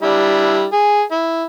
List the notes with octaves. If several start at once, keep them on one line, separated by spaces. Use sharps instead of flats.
G3 D4 E4
G#4
E4